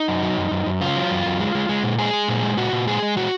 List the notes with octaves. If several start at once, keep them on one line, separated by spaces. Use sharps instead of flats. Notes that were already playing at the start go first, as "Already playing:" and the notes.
Already playing: D#4
F#2
F#3
F#2
F#2
F#2
C#3 F4
F#3
F#2
F#2
G#3
G#3
G#3
A#2
G#3 G#4
G#3
A#2
G#3
A#2 F#4
A#2
G#3 G#4
G#3
A#2 F#4